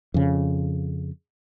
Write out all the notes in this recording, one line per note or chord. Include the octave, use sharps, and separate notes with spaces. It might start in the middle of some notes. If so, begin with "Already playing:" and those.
F2 C#3